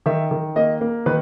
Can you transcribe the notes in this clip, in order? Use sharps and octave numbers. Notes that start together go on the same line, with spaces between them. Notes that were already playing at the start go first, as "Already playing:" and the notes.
D#3 E5
D#3
A#3 D#5
A#3
D#3 B4